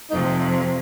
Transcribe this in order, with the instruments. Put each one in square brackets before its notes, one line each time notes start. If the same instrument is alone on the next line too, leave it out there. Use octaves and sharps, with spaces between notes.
[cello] F2 C3 [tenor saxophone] D#4